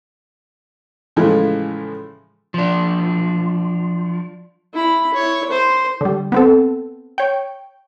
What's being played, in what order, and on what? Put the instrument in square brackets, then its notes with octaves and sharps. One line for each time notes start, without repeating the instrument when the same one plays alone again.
[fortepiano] A2 C#3 E3 F3 G#3
[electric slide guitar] F3 D4
[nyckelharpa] E4 B5
E4 C#5
C5
[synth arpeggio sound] D3 G3
B3 C4 A4
C#5 G5